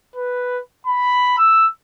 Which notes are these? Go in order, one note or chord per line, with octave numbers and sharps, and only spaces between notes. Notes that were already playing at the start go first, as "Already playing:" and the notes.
B4
B5
E6